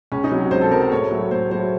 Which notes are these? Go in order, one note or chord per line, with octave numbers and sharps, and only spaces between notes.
C#2 C#4
D#4
C3 F#3
C#2 C5
A4
C3 F#3 A#4
A4
A2 C#5
F#3 A3
A2 C5
F#3 A3 C5